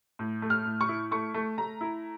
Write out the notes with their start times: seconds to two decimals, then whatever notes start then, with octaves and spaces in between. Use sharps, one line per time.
0.19 A2
0.42 A3
0.50 F6
0.66 A2
0.81 C#6
0.89 E4
1.11 A3 C#6
1.34 A3
1.58 A3 A#5
1.81 E4